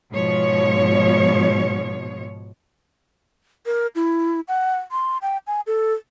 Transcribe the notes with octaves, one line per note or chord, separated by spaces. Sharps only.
G#2 B2 F3 C#5
A#4
E4
F#5
C6
G5
G#5
A4